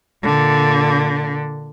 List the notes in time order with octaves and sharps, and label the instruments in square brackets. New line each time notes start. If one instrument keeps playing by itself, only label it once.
[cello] A#2 D3